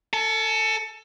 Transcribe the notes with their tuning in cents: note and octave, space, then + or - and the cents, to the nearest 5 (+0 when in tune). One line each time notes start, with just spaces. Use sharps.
A4 +25 A5 -45